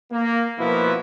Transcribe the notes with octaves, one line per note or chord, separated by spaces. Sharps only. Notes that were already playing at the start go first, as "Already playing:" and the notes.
A#3
B2 F3 A#3 E4 F#4 B4